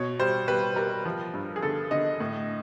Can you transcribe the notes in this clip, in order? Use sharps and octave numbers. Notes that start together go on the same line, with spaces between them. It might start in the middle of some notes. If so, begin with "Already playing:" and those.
Already playing: B2 C#5
G3 C5
G3 B4
G3 A#4
F3
G2
G#4
D3 A4
D3 D#5
A2